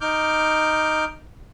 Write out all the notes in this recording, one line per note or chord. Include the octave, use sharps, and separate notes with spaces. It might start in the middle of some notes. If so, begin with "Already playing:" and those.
D#4 D6 F6 G6